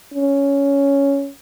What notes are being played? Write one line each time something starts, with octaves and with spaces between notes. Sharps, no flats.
C#4